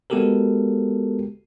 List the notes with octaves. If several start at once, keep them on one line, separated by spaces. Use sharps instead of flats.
G#3 B3 F#4 G4 A4 A#4